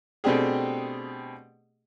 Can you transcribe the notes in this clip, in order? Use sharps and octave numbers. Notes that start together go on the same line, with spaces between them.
B2 A3 C4 D4 G4 G#4